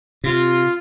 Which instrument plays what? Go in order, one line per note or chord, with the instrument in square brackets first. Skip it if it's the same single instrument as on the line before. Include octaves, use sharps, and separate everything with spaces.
[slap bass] C3 [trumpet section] F4